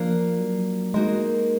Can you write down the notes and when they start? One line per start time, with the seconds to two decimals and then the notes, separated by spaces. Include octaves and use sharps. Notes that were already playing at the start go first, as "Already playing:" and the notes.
Already playing: F3 A#3 D4 F4
0.39 F#3
0.94 G#3 A#3 D#4 F#4 A#4